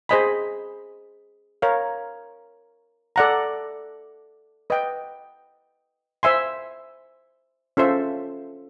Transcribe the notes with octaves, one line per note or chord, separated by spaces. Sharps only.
G#4 C5 D#5 G#5 B5
A#4 C#5 F5
A4 D5 F#5 A#5
B4 D#5 G5
C5 E5 G#5 C6
C#4 F4 A4 C5 E5